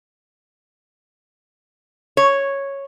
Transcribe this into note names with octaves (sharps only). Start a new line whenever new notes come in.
C#5